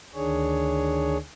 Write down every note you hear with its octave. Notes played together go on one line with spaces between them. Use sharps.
D2 D#3 D4 G#4 C#5